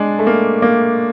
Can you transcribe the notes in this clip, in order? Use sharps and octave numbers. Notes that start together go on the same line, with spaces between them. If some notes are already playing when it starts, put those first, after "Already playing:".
Already playing: G#3 D4
A3
A#3
A#3